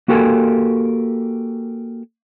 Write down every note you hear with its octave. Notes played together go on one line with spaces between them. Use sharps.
A#3 F#4 G4 A4 A#4 G#5